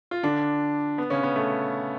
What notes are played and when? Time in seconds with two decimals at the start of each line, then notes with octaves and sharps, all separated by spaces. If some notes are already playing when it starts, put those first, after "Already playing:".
0.11 F4
0.23 D3 D4
0.98 B3
1.10 C#3 C#4
1.23 B3
1.36 A3